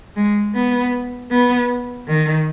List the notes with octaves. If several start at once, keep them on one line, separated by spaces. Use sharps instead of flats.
G#3
B3
B3
D#3